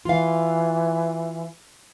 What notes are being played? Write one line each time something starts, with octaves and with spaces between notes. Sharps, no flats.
E3 F4 F5